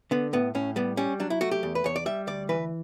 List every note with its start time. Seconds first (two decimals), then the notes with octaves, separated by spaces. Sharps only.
0.11 D3 B3
0.33 A2 B3
0.55 A2 C#4
0.76 G3 B3
0.97 G3 C#4
1.20 F#3 D4
1.30 E4
1.41 A3 F#4
1.51 G4
1.63 E2
1.75 B4
1.84 E2 C#5
1.96 D5
2.06 G3 E5
2.27 D2 D5
2.49 E3 B4